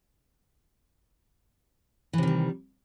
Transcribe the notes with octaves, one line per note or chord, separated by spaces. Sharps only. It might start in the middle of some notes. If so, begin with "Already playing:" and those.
C3 D#3 E3 G3